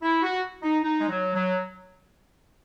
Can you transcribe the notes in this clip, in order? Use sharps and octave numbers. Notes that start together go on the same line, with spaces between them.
E4
F#4
D#4
D#4
G#3
F#3
F#3